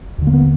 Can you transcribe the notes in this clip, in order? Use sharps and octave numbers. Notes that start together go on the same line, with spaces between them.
D#2 D3
A#3
B3